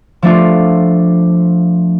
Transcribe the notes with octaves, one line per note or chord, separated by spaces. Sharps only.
F3 A3 D4 F4